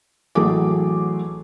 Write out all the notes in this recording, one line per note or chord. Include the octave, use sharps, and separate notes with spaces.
A1 F#3 A3 G#4 D6